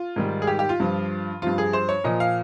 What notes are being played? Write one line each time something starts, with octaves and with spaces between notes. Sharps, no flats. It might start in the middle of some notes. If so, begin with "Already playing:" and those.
Already playing: F4
G#2 D#3 G3
G#4
G4
G4
F4
G2 F3
G2 F3 F4
G#4
C5
C#5
A#2 F3 D#5
F5